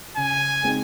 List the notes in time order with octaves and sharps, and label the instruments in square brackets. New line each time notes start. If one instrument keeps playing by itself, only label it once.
[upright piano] C#3 [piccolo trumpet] G#5
[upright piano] G#3 C4 D#4 G#4